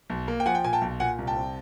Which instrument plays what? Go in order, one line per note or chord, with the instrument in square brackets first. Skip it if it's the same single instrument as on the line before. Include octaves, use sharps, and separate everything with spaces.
[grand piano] B1
A#3
G5
F3 F#5 G#5
G5
A#2 G#5
G5 A5
B1
A#2 F#5 G#5
C2
G5 A5
C4